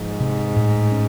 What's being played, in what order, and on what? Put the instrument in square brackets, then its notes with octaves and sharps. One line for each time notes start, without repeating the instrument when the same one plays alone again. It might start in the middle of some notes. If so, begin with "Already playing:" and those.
Already playing: [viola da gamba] G#2 [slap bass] F3
[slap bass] C3
A2
C#4